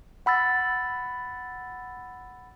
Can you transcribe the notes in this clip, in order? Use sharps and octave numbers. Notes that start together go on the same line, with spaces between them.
F#5 B5 E6 A6